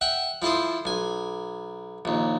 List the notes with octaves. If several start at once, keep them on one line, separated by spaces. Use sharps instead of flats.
E5 F#5 G5
F3 E4 A4 C5 D#6
B1 G#5
A#1 D#2